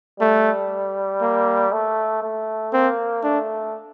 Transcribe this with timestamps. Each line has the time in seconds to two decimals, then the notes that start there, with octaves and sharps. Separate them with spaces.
0.20 G3 A3
1.21 A#3
1.72 A3
2.23 A3
2.73 A#3 C4
3.23 A3 D4